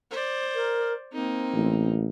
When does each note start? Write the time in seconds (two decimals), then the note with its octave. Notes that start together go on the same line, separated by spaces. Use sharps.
0.11 C5 D5
0.55 A#4
1.12 A#3 C4 D#4
1.54 A1